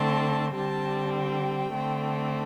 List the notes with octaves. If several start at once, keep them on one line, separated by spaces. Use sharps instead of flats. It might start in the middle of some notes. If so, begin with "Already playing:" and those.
Already playing: D3 A3 C4 A5
D3 G3 C4 A5
G5
D3 A3 C4